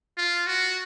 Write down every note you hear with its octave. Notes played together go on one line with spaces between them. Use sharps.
F4
F#4